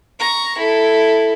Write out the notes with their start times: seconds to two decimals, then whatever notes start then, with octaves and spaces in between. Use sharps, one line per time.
0.20 A#5 C#6
0.58 E4 A4